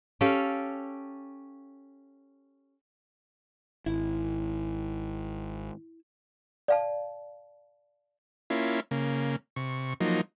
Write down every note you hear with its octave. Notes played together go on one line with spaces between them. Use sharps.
C#4 G4 A4 F5
G#1 E4
D5 F5 A5
A#3 C#4 E4 F4
C#3 A#3
C3 C#6
F3 F#3 A#3 D#4